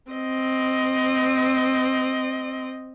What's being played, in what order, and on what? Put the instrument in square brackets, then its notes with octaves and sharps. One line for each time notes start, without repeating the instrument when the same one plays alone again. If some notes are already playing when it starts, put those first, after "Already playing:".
[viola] C4 D#5